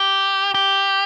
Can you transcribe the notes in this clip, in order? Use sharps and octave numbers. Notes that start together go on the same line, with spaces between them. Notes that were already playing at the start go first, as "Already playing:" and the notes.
Already playing: G4
G4